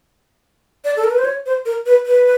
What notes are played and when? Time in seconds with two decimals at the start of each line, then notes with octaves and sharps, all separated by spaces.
0.84 D5
0.97 A4
1.04 A#4
1.11 B4
1.18 C5
1.25 C#5
1.46 C5
1.65 A#4
1.86 B4
2.06 B4